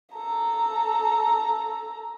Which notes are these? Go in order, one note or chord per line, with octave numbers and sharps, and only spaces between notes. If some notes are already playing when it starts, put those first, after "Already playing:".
A4 A#5